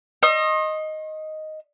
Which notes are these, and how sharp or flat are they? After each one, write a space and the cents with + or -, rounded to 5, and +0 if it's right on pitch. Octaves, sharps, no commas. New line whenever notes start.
D#5 +0 C6 +45 E6 +40